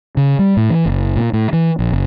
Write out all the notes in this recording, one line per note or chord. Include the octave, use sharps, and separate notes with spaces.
C#3
G3
A2
E3
F#1
A#2
A2
E3
A#1
F#1